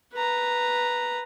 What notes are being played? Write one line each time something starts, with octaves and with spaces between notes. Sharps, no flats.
B4 A#5